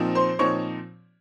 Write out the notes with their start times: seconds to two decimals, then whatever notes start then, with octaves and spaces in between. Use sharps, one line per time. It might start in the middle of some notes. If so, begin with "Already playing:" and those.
Already playing: A#2 F3 C4 D#4
0.15 C5 C6
0.39 A#2 F3 C4 D#4 C#5 C#6